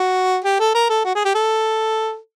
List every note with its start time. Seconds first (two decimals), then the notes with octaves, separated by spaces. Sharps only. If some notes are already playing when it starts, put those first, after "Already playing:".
Already playing: F#4
0.44 G4
0.60 A4
0.75 A#4
0.89 A4
1.05 F#4
1.15 G#4
1.25 G4
1.35 A4